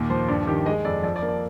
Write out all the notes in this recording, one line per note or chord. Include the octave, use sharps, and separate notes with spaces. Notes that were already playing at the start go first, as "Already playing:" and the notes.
Already playing: D#2 A#2
F3 C5
G2 D5
D#3 G4
G#3 D#5
F2 D5
F3 D5
D5
A#3
D5